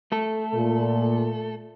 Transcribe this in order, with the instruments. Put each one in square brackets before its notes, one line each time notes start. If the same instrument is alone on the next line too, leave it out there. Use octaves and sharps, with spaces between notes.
[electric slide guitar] A3 A4
[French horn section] A#2